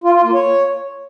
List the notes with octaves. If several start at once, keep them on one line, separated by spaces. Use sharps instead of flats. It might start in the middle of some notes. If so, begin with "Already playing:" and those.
F4
F4
A#3
C#5